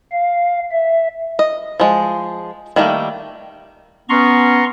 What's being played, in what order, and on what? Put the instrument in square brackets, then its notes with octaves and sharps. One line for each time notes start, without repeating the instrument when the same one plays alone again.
[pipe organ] F5
E5
[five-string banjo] D#5
F3 G#3
D#3 G3 A3 A#3
[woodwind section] B3 C#4 [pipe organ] A#5 C6 C#6